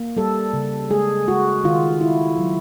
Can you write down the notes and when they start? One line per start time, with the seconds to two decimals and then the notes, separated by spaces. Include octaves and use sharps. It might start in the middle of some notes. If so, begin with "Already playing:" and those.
Already playing: A#3
0.17 G3 A4
0.53 C#3
0.90 G#3 G#4
1.28 G#3 F#4
1.64 D#3 F4
2.01 D#3 E4
2.38 F#3